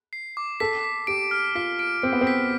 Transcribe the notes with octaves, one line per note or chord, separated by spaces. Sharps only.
C7
D6
A4 B6
B6
G4 D7
F6
F4 B6
D7
C4 D7
B3
C4
B6